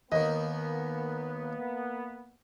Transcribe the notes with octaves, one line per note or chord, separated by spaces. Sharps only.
D#2 D#3 A#3 B3 D#5